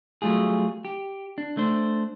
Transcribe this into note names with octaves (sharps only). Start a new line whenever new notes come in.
F#3 G3 A3 F4 G#4
G4
D4
A3 D4 C5